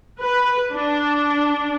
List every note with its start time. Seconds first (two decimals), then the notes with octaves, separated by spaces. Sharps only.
0.21 B4
0.73 D4